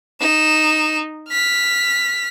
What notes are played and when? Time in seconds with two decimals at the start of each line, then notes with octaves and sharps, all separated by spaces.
0.21 D#4 E7
1.30 F6 B6